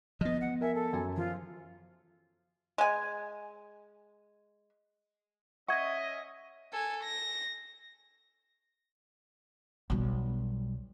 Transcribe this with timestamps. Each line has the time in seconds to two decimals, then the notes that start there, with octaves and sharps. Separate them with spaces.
0.21 F3 B3 D#5
0.41 F#5
0.61 A#4 E5 G#5
0.75 A4
0.93 F#2 G#5
1.17 F3 F4
2.78 G#3 G#5
5.68 C#4 D#5 E5 F#5 C#6 G#6
6.73 A4 G#5
7.03 A#6
9.90 B1 G3